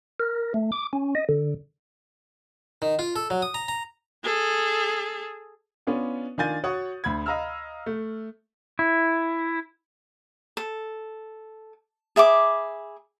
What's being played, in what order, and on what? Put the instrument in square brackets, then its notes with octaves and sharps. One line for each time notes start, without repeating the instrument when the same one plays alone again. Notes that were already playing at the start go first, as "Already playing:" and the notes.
[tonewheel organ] A#4
A3
D6
C#4
D#5
D3
[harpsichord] D#3
F4
A4
F#3
D#6
A#5
A#5
[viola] G#4 A4
[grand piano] B3 C#4 D4 F4
D#3 D4 F4 G#5 G6 A6
F#4 C#5 F#5 C#6 D#6
D2 B5 G#6
D#5 F5 A#5 B5 E6 F6
A3
[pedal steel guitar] E4
[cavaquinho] A4
G#4 E5 B5 D6